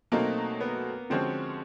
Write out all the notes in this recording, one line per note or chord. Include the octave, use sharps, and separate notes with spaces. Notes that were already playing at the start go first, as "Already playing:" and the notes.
B2 F#3 A3 A#3 C4 D#4
B3
D3 F3 G#3 C4 C#4 F#4